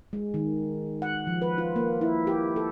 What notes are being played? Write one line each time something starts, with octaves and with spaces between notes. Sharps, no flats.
G#3
D#3
F#5
F3
B4
F4
A#3
E4
G4
A4